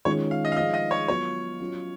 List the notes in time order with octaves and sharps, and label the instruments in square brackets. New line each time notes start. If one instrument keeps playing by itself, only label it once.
[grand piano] D#3 G#3 C#4 F4 [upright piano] C#5
[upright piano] F5
D#5
F5
[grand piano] F3 G#3 D#4 [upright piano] D#5
[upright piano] D#5
C#5
[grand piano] F#3 B3 F4 [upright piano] C#5
[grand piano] F#3 C#4 F4